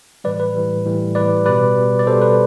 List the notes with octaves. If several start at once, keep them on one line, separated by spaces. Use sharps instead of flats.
A2 E3 G3 B4 D5
B4
A2 E3 G3
A2 E3 G3
A2 E3 G3 B4 D5
B2 G3 B4 D5
B2 G3
D5
B2 G3 A4 C5
B4